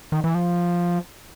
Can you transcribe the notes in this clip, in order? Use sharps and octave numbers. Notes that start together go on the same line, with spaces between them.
D#3
E3
F3